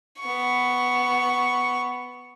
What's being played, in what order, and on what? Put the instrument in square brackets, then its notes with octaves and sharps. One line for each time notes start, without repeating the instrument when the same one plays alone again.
[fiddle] B3 C#6